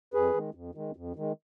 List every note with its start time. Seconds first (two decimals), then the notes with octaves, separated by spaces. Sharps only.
0.14 F2 G#4 B4
0.34 D#3 G#3
0.55 F2
0.75 D#3 G#3
0.96 F2
1.16 D#3 G#3